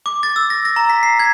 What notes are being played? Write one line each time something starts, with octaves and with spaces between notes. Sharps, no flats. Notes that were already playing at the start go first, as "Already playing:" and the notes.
D6
A6
E6
A#6
A#6
A#5
B6
C7
G#6